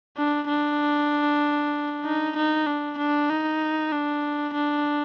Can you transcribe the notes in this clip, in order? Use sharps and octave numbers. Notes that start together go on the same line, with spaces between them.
D4
D4
D#4
D#4
D4
D4
D#4
D4
D4